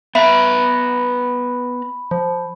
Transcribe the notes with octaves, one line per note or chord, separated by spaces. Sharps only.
B3 B4 E5 A#5 B5
F3